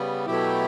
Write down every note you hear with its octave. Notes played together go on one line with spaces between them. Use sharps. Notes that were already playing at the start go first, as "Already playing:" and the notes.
Already playing: C#3 G3 B3
B2 F#3 A3 E4 G4